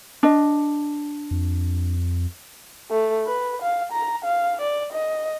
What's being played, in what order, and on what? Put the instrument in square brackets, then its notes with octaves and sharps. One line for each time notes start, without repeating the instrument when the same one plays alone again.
[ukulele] D4 D#5
[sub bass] F2
[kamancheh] A3
B4
F5
A#5
F5
D5
D#5